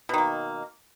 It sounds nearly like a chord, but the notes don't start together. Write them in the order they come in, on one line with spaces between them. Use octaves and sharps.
B2 D#3 A#3